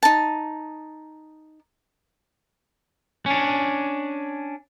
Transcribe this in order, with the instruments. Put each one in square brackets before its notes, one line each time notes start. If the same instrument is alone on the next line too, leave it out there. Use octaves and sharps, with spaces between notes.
[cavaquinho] D#4 A5
[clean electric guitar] C#4 D4